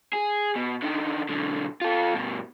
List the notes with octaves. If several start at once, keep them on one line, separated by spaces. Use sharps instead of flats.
G#4
B2
D3 D#3
B1 D3
F4 A4
G2 B2